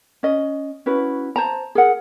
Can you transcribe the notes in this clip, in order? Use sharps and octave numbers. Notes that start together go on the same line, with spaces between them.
C#4 D#5
C#4 E4 F#4 B4
C5 A5 A#5
G#4 A#4 F#5